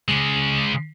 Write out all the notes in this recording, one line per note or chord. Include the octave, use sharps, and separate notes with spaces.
C#3 G#3